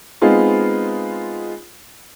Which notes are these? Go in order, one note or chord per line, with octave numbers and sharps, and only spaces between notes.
G#3 B3 C4 D#4 F4 G#4